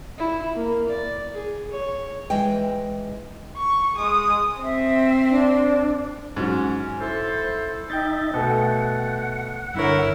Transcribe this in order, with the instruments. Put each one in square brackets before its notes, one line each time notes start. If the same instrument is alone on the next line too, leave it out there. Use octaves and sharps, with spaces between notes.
[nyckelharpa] E4
A#3
D5
G#4
C#5
[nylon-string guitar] E3 G#3 G5
[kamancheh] C#6
G#3 D#6
[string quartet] C4 [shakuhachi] E5
[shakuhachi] D4
[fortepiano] G#2 F#3 [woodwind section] C#4
[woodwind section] E4 A4 C5
[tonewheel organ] D#4 D#5 E5 [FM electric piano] G5 G6 A6
[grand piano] B2 A3 [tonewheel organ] F#5
[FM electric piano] G2 D3 C#5 [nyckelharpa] E4 A#4